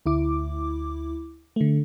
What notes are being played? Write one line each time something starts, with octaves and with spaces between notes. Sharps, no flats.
D2 E4 D6
D3 A3